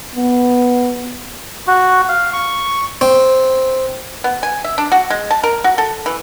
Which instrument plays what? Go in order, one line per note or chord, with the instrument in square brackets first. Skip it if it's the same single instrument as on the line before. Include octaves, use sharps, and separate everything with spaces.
[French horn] B3
[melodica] F#4
F5
C#6
[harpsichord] C4
[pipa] B3
G#5
E5
D4
F#4
G#3
A5
A#4
F#4
A4
E3